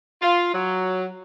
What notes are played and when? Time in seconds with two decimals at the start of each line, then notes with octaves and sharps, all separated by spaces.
0.21 F4
0.53 F#3